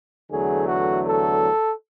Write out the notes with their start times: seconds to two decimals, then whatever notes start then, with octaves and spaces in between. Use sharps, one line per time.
0.30 E2 D3 F#3 A3 G#4
0.68 F#4
1.05 A4